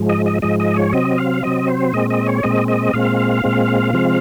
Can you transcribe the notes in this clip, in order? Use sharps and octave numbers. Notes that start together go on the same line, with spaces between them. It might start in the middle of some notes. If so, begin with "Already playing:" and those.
Already playing: G#2 F3 G#3
D#5
D#5
G#2 F3 G#3 D#5
D#5
C#5
C3 F#3 C4 D#5
F5
C3 F#3 C4 D#5
C5
A#2 G#3 C4 D#5
D#5
C#5
A#2 G#3 C4 D#5
D#5
A#2 G#3 C4 F5
A#2 G#3 C4
C3 F3 G#3 C4